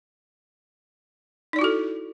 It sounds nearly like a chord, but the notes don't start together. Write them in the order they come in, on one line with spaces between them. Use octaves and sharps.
D#4 D5 E4 F#4 A4